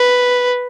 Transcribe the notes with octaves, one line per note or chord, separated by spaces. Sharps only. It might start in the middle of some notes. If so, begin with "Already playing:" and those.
Already playing: B4